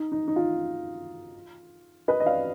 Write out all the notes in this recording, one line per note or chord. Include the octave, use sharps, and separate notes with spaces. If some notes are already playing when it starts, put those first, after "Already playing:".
Already playing: D#4
D#4
D#4
F4
B4 D#5
D#5
D5 F5